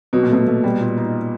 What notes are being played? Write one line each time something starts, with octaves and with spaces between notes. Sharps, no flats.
B2 F#3
A#2
B2 A3
A3
G3
A#2
D#4